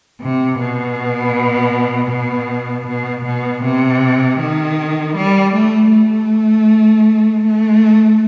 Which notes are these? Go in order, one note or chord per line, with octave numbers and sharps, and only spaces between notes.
C3
B2
B2
B2
B2
C3
D#3
G3
A3
A3
A3